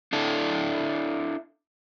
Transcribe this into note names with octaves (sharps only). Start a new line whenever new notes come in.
D4 E4 A4